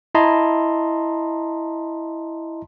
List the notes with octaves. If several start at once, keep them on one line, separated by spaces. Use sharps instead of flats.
E4 D#5 A5 A#5 C6